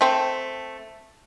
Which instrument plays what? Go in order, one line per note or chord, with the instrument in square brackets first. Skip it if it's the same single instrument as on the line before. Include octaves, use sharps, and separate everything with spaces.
[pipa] A3 C4